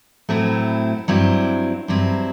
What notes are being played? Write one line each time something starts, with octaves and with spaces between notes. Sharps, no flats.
A2 F#3 A3 C4 E4
G2 F#3 C4 E4
G2 F#3 C4 E4